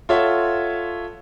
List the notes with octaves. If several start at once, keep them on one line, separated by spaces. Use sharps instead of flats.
F4 A4 C#5 E5 F#5